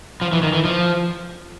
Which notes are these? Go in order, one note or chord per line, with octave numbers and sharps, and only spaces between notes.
F3
E3
D#3
E3
F3